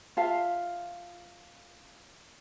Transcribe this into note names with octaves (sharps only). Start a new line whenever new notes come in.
F4 E5 F5 A5